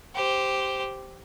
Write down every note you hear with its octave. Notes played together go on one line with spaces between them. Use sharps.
G4 C5